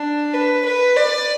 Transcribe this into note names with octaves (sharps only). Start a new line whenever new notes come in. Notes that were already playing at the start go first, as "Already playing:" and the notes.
Already playing: D4
B4
B4
D5